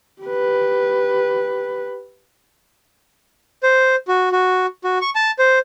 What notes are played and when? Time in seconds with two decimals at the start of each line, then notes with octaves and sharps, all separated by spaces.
0.22 G4 B4
3.63 C5
4.08 F#4
4.32 F#4
4.84 F#4
5.01 C#6
5.15 A5
5.39 C5